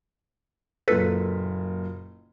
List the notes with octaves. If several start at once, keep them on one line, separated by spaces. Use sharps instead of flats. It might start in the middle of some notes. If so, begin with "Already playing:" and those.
F#1 A#2 A4 B4 B6